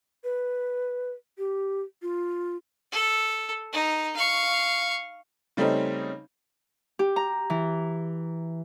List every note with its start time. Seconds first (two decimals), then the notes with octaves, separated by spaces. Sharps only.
0.24 B4
1.38 G4
2.02 F4
2.92 A4
3.73 D#4
4.16 F5 C#6
5.57 C#3 G3 A3 C4 C#4 D#4
6.99 G4
7.16 A#5
7.50 E3